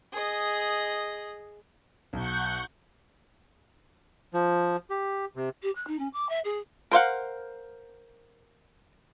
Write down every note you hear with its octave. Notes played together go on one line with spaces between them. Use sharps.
G#4 D#5
B1 F#5 C#6 G6
F3
G4
C3
G4
F#6
D#4
C#4
D6
E5
G#4
A#4 C5 F5 F#5